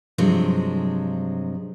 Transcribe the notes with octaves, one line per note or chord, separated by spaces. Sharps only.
G2 C3 F3 F#3 G#3